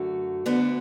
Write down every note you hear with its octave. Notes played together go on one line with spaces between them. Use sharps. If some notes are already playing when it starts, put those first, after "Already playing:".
Already playing: F#2 D3 A3 F#4
D2 D3 B3 D4